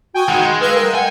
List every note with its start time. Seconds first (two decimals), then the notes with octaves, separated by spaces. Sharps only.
0.14 F#4 G5 G#5 D#6
0.28 D#3 G#3 F#5
0.42 G#3
0.61 B4 F5 E6 G#6
0.75 A#4 G5
0.95 F#5 G#5